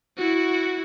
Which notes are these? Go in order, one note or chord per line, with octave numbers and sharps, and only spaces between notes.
E4 F#4